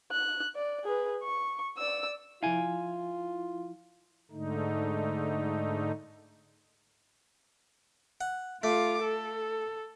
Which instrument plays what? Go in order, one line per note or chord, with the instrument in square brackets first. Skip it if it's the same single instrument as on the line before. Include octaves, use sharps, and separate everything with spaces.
[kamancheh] F#6
D5
G#4 B4
C#6
D5 E6
[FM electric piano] F3 E4 [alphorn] F4 [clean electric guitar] F5 G#5
[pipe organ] G#2 D3 A3 D#4
[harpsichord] F#5
[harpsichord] A3 [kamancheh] F4 D6
[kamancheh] A4